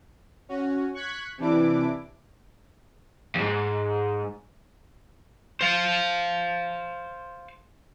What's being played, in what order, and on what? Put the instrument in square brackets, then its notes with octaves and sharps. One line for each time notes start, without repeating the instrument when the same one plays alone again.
[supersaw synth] C#4 F#4
C#6 F#6 G#6 B6
C3 E3 D4 E4 D6
[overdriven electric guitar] E2 G#2
C5 F5